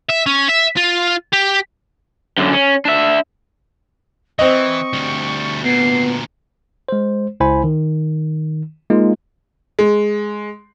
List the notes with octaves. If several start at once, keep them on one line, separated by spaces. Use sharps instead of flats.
E5
C#4
E5
F4
G4
F#2 D3
C#4
D4 E5
E3 C4 D#5 C#6
D2 G3
D2 A#2 B3 C7
G#3 C5
C#2 E4 C5 G#5 B5
D#3
G#3 A#3 D#4 F4
G#3